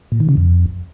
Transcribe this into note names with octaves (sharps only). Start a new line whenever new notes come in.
A#2
D#3
C#3
F2